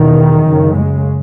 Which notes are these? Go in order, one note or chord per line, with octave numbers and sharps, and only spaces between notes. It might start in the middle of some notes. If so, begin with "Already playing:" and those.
Already playing: E2 B2 D#3
F#2 C#3
G#3